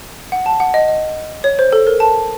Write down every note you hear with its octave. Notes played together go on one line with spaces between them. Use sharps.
F#5
A5
F#5
D#5
D#5
C#5
C5
A4
A#4
A5